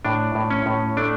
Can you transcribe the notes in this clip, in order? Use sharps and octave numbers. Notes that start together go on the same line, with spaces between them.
A2 D4
A2
C#4
A2
A3 D4